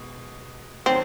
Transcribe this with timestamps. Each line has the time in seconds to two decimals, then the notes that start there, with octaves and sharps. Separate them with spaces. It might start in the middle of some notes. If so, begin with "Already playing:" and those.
Already playing: B2 G#3
0.86 D#3 F#3 A3 C4 C#4